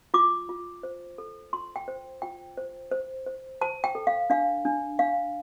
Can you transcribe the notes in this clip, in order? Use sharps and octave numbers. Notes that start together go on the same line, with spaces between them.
F4 D6
F4
C5
A4
F4 C6
G5
C5
F4 G5
C5
C5
C5
C5 A5
G5
A4
F5
D4 F5
D4
D4 F5